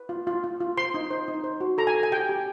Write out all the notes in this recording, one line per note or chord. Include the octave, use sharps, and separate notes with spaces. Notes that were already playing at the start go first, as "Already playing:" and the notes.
Already playing: B4
F4
F4
F4
F4
C5 C6
D#4
C5
D#4
C5
F#4
A4 A#5
G#5
A4
G#5
G4 G5
G4